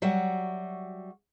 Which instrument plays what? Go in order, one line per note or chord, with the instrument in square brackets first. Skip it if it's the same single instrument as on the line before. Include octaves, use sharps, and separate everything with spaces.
[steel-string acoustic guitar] F#3 G3 F#4 E5 F#5